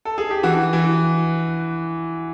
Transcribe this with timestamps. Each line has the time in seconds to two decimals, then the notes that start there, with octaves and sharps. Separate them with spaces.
0.05 A4
0.18 G#4
0.31 G4
0.43 E3 F#4
0.73 E3